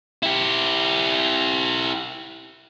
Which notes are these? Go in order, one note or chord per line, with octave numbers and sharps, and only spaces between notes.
E4 G4